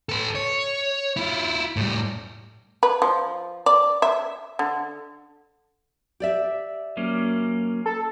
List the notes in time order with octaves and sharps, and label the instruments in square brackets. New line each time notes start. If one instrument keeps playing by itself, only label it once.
[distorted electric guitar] A4 B4
C#5
E4 F4
A2 G3
[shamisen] B4
F3
D5
E5
D3
[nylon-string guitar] G4 D5 E5
[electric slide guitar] F#3 A#3 C#4
[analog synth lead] A4